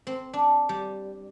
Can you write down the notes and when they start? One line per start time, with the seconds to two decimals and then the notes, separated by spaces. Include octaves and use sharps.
0.07 C4
0.33 D4
0.69 G3